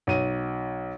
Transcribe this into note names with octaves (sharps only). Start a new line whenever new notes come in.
B1 D#7